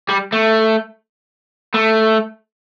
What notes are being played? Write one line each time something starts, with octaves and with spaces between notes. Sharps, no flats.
G3
A3
A3